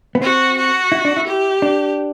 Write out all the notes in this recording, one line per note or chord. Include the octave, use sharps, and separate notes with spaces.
B3
C4 F#4
F#4
E4
D4
E4
G4
D4